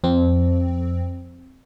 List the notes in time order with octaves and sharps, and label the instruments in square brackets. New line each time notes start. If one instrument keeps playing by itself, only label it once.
[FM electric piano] F2 C4